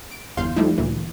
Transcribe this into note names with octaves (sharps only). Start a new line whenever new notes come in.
D7
G1 E2 F5 C6 G6
F3 G3 A3 D#4 E4
D2 A#2 E3